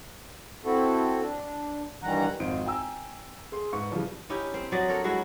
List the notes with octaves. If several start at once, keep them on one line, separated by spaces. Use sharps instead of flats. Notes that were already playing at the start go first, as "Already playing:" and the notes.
C4 E4 F#4 A4
D4
G2 D#3 E3 G3 F#5 A#5
G#1 F2 D#4 F4 C5 D7
G5 G#5 A#5 E6
G#4 C6
G#2 B4 C#6
C#3 E3 F3 G3
C#4 D#4 E4 G4
C4
F#3 D5 D#5
D4 A4 A#4 C#5
F#3 G#3 E4 F#4